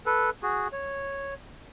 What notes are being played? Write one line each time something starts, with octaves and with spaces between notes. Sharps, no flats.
A4 B4
F#4 G#4
C#5